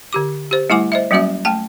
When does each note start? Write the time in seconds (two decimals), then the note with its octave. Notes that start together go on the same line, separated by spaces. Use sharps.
0.13 D3 G4 D6
0.51 G4 C5
0.70 G3 A3 E4 F#5 G#5 D6
0.92 C5 D#5 E5
1.11 F#3 G3 A#3 C#4 F#4 E5
1.45 A3 G5 A5